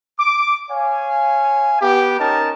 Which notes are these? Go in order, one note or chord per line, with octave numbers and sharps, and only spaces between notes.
D6
C#5 F5 G#5
B3 G4
C#4 D#4 A#4 A5